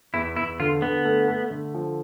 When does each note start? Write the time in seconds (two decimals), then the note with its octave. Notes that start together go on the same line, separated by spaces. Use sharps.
0.14 E2 E4
0.36 E2 E4
0.60 D3 F4
0.82 D3 B3
1.05 A3
1.28 A3
1.50 D3
1.74 F3